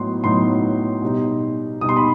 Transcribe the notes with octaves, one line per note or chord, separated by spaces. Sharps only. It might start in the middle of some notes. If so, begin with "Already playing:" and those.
Already playing: A2 F#3 B3 D#4 C6
A2 F#3 B3 D#4 C6
B2 G3 D#4
B2 G3 D#4 D#6
C6
B5